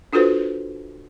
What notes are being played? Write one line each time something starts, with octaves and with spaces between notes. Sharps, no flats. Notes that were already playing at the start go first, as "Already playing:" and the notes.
D4 F4 F#4 A4 B4 C5